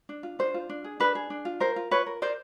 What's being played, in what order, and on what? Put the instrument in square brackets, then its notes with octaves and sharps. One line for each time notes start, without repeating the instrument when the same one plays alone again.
[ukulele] D4
F4
D4 C5
F4
D4
G#4
D4 B4
G#4
D4
F4
A#4 C5
F4
F4 B4 C#5
A#4
A#4 C5 D5